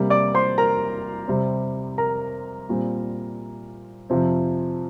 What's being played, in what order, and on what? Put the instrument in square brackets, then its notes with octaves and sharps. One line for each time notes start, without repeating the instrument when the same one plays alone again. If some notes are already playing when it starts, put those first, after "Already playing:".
Already playing: [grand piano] C3 G3 A#3
D5 D6
C5 C6
A#4 A#5
C3 G3 C4
A#4 A#5
A#2 G3 C4
F2 C3 F3 C4